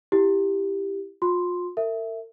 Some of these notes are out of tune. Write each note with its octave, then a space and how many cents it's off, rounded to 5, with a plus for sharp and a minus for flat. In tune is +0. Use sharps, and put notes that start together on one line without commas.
E4 +0 G4 +5
F4 +35 C6 +0
A#4 -45 E5 +0